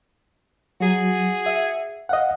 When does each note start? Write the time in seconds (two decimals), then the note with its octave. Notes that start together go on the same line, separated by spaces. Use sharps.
0.80 F#3 F#4 G#4
1.46 E5
2.09 D#5 F5 F#5